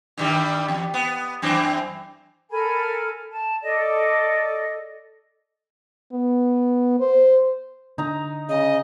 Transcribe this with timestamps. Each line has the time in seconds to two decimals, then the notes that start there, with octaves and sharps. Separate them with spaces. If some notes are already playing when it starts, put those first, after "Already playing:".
0.17 G2 D#3 G3
0.68 E2
0.94 B3
1.42 F#2 E3 C4
2.51 A4 A#4 G#5 B5
3.32 A5
3.62 A4 D5 D#5
6.12 B3
7.00 C5
7.98 D3 D#4 A#5
8.49 C#3 D#5